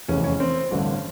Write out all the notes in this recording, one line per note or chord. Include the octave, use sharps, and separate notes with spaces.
F1 E2 C#3 E3 C#4
C#4
C4
A1 G2 D3